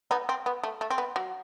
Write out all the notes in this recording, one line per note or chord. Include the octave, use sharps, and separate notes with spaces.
B3 D#4
C4
B3
A3
A3
C4
B3
F#3